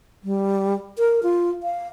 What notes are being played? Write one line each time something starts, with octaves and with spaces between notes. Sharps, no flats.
G3
A#4
F4
F5